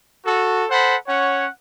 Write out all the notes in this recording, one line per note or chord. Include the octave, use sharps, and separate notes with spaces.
F#4 A4
A4 C5 F#5 B5
C#4 C#5 F#5